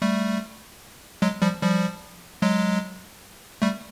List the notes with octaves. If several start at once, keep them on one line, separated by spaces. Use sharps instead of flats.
G3 A3
F#3 G#3
F3 G3
F3 G3
F#3 G#3
G3 A3